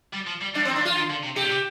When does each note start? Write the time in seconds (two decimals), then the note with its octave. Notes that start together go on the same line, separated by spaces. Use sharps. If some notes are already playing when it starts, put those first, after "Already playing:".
0.14 G3
0.27 F3
0.42 G3
0.55 G3 D4
0.63 F3 C4
0.71 D#3
0.76 D4
0.79 F3
0.85 F4
0.96 D#3
1.10 D3
1.23 C3
1.36 C3 G4
1.45 A#2
1.50 C3